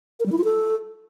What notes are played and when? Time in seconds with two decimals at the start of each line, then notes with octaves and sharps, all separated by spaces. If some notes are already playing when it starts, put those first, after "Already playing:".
0.20 A#4
0.26 G3
0.32 E4
0.38 F4
0.44 A4